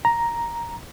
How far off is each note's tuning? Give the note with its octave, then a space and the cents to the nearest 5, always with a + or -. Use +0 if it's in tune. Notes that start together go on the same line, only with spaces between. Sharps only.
A#5 +5